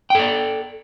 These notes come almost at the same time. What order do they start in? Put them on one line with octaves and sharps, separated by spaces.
G5 A4 D5